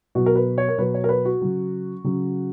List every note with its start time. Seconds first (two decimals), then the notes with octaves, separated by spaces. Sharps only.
0.15 B2 F#3 F#4
0.26 A#4
0.36 B4
0.58 C#5
0.68 A#4
0.78 B2 F#3 B4
0.94 C#5
1.04 A#4
1.09 B4
1.25 F#4
1.41 C#3 F#3
2.04 C#3 F#3